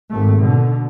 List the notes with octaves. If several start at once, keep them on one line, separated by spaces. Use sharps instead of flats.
G#1 A3
B2 D3